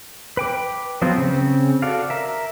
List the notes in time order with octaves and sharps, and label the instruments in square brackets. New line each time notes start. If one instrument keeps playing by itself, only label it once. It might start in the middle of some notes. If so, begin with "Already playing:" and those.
[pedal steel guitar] B4 G5 D6
F3 F#3 B3 C4 F4
C#3 C4
F#4 A4 D5 F5
A#4 E5